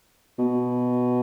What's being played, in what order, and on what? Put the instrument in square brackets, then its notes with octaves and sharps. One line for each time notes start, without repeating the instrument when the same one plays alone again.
[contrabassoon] B2